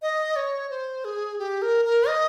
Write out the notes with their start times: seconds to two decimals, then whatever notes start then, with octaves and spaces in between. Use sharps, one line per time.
0.02 D#5
0.36 C#5
0.70 C5
1.05 G#4
1.39 G4
1.62 A#4
1.85 A#4
2.08 D#5